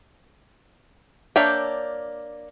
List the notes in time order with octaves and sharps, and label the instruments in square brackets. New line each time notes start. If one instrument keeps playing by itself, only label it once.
[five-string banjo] A#3 D4 C#5 E5 G5